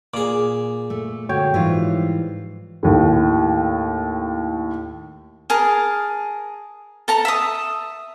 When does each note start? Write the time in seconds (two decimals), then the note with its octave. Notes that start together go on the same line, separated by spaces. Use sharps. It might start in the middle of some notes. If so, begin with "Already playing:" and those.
0.14 A#2 G#4 D6
0.90 A3
1.29 D3 G#3 F#4 C#5 G5
1.54 G#2 E3 F3 G3 F4
2.83 D#2 A2
5.50 G#4 A#4 A5
7.08 A4 A5 A#5
7.25 E5 D#6